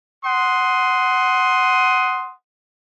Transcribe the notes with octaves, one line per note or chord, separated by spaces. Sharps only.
F#5 C6 D#6